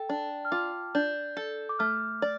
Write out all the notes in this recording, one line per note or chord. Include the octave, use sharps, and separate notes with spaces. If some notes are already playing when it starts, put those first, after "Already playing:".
Already playing: A4 G5
D4 A5
F6
F4 D6
D4 G6
A4
D6
A3 F6
D5